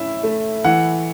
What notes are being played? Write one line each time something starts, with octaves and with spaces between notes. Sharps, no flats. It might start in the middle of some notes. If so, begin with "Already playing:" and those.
Already playing: A2 C#4 E4 E5
A3
E3 F#5